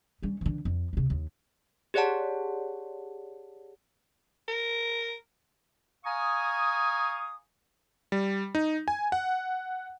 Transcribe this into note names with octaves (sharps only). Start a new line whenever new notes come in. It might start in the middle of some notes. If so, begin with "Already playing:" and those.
G3 C#4
D3 E3
F2
D2 C3
D#2
G4 G#4 C#5 D5 F#5 A5
A#4
F5 G#5 A#5 C#6 D#6
G3
D#4
G#5
F#5